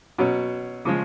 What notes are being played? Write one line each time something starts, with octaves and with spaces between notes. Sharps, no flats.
B2 F#3 C#4
C#3 F3 G#3